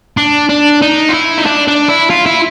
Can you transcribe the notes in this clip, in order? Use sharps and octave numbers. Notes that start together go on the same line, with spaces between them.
D4
D4
D#4
F4
E4
D#4
D4
D4
E4
F4
E4